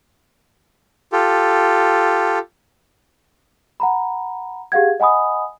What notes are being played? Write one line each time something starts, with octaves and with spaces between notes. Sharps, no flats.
F4 G4 A4
F#5 A#5 B5
G4 G#4 F5 F#5 G#6
D#5 F#5 G#5 B5 D#6